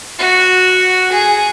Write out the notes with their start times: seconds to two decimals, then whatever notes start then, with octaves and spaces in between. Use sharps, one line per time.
0.19 F#4
1.12 G#4